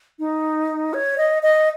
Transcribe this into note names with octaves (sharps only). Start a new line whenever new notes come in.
D#4
C#5
D#5
D#5